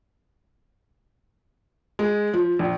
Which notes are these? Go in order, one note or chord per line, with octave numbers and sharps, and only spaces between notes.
G#3
F3
A#1